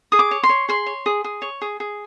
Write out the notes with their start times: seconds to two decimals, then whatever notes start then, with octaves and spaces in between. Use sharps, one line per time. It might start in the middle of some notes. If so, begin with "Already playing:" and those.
0.12 G#4 D#6
0.19 D6
0.31 C#5
0.43 C6
0.49 C#5
0.69 G#4 C6
0.87 C#5
1.06 G#4
1.24 G#4
1.42 C#5
1.62 G#4
1.80 G#4